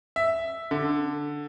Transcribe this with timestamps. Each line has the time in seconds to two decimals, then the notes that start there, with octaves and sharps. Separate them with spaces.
0.16 E5
0.71 D3